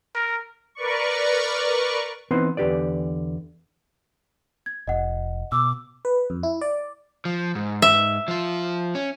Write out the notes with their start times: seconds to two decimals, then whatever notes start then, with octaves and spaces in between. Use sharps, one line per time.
0.15 A#4
0.75 A#4 B4 D5 C#6
2.31 E3 B3 C4 D#4 B4 C5
2.57 E2 D3 G4 B4 D5
4.66 G#6
4.88 F1 D#5 F#5
5.52 B2 D6 E6
6.05 B4
6.30 F2
6.43 E4
6.61 D5
7.25 F3
7.55 G#2
7.82 E5
8.28 F3 F4
8.95 C#4